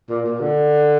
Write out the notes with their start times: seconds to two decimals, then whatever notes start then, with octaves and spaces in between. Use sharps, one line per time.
0.09 A#2
0.25 A#2
0.41 D3